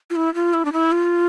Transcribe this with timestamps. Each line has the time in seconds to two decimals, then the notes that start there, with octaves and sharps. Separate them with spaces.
0.10 F4
0.16 E4
0.34 F4
0.54 E4
0.65 D4
0.73 E4
0.92 F4